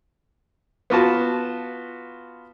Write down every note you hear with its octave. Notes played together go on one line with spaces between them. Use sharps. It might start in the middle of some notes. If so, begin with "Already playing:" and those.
B3 F4 F#4 A5